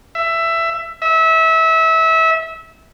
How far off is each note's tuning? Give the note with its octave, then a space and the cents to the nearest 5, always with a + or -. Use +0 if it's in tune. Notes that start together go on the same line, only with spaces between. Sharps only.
E5 +15
E5 -25